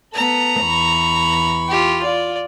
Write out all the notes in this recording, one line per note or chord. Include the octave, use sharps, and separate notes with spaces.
B3 A4 A#5
E2 B5 C#6
F4 G4
F4 D5